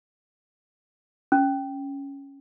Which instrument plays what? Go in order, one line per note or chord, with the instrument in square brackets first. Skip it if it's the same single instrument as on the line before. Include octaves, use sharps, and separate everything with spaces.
[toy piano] C#4